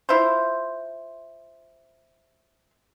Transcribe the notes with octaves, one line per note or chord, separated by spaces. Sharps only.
E4 F4 C5